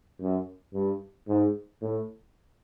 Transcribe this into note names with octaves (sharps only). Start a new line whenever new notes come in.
F#2
G2
G#2
A2